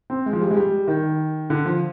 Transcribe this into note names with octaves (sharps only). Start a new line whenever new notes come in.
C4
G#3
F3
G3
G#3
G3
D#3
D3
F3